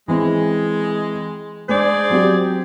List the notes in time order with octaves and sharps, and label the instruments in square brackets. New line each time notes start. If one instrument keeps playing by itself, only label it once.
[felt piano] E3 C4 [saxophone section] G#3
[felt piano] G#3 D4 [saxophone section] G#4 C5 D5
[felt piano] F#3 C4 G4